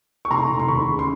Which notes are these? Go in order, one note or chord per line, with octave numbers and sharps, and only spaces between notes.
C#6
F1 A#5 C6
F1
C6
D#2 B5 C#6
C#3
C6